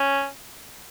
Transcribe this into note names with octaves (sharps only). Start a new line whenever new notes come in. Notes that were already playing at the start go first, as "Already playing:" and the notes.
Already playing: C#4